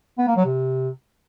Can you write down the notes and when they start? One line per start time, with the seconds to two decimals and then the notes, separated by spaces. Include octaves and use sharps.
0.18 B3
0.27 A#3
0.36 F#3
0.46 C3